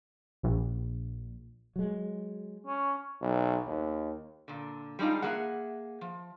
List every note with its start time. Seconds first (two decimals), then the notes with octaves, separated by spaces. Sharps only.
0.43 A#1
1.76 F#3 G#3
2.66 C#4
3.21 B1
3.67 D#2
4.48 A#2 D3
4.99 G3 G#3 D4 D#4 F4
5.22 A#3 G#4 E5 F#5
6.01 F3